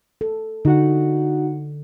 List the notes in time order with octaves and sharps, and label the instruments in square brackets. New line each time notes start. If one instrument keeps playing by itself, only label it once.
[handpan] A4
[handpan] D3 [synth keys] D#4 F#4 F#5